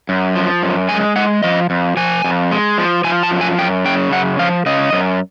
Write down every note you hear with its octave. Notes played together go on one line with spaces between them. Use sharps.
F#2
F3
F#2
G#3 G#5
G#3 F#5
F3 D#5
F2
F3 G#5
F2
G#3
F3
F3 G#5
A5
F#2
G#5
F#2 G5
C#3 G5
F#2 F#5
F3 F5
C#3 D#5
F#2